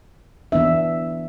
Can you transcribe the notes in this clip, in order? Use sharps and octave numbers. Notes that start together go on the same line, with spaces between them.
E3 B3 D4 E5